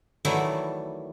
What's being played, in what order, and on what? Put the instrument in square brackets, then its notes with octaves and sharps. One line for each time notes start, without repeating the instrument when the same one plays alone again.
[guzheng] D#3 E3 F#3 G3 A3 E4